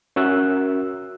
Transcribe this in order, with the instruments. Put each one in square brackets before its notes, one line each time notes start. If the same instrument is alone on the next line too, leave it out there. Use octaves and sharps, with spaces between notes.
[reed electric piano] C#4 F#4 A#4 E5 E6 F#6